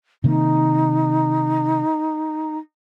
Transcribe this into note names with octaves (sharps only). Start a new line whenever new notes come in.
C3 D#3 A#3 D#4